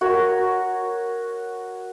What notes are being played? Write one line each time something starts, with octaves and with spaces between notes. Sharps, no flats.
F#4 A#4 C#5